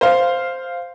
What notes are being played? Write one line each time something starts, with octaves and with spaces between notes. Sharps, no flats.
C5 F5